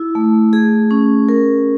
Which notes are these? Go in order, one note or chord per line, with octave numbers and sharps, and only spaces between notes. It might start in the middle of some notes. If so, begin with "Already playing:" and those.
Already playing: E4
A3
G#4
C#4
A#4